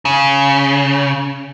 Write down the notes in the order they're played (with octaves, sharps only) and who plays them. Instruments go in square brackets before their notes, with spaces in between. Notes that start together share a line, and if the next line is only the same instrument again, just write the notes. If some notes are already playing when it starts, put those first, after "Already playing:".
[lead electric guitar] C#3